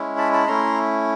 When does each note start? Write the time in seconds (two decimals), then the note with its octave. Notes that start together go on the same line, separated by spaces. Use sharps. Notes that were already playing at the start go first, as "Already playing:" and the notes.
Already playing: G#3 C#4 E4
0.17 A5 B5
0.33 A5 B5
0.47 A3 C#4 E4 A#5 C6